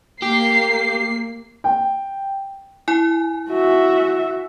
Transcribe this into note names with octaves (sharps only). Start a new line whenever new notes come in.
A#3 G4 C7
G5
E4 G#5
F#4 E5